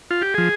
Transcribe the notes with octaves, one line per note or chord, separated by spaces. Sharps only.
F4
G4
F3 G#4